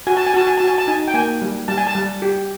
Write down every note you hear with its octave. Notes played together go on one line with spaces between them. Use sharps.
F#4 G#5
A5
G#5
F#4 A5
G#5
F#4 A5
G#5
A5
D#4 G#5
G5
A#3 G#5
G3
G3 A5
G#5
A5
G3
G4